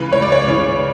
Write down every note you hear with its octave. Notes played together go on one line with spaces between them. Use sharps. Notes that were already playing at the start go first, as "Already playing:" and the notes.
Already playing: C#2 C#3 E3 B4
C#2 C#5
D5
C#5
C#3 E3